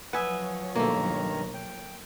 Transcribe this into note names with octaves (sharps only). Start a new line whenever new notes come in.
F3 F#3 B4 C#5 E5 F#5 G#5 D#6
G2 B2 D#3 A3 A#3 A#5
G5